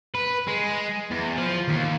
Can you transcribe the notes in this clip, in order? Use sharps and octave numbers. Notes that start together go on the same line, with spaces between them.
B4
G#3
E2
F3
D#2